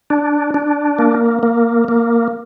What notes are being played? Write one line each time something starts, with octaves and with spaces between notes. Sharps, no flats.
D4
D4
A#3
A#3
A#3